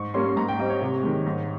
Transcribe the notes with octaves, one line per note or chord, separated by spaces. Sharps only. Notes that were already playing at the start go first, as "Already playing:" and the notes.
Already playing: G#2 C#6
G3 A#3 C#4 C6
G#2 A#5
G5
G3 C4 D#5
C#5
C3
D#3 G#3
G#2